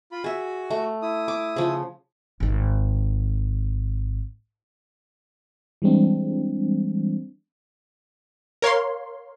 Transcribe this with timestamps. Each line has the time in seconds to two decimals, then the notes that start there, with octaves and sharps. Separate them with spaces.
0.12 F4 B5
0.24 F#4 G#4 E5
0.70 A3
1.02 E4 D#6
1.28 D6
1.56 C#3 F3
2.40 G#1 D#4
5.82 E3 G3 G#3 C4 D4
8.62 A#4 C#5 F5 C6